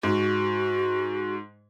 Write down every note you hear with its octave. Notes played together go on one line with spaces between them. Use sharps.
G#2 F#4